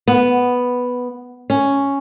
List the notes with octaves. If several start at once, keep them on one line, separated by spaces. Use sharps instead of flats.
B3
C#4